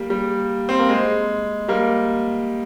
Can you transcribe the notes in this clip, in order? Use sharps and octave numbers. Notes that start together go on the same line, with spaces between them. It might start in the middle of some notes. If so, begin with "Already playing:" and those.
Already playing: G3 A#3
G3
C4
A#3
G#3
G3 A#3